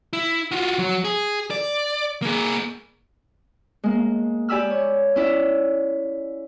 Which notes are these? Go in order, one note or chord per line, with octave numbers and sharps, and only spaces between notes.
E4
F4 F#4
F#3
G#4
D5
A#3 G#4
G#3 A#3
G4 D5 G#5 B5 E6 F6
C#5
C#4 E4 D5 E5 F5